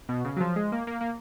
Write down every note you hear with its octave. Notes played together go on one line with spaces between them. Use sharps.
B2
C#3
F#3
F3
G#3
A#3
A#3
A#3